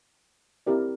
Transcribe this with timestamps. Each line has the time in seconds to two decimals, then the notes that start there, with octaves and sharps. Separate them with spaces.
0.67 C4 E4 G4 A#4 D5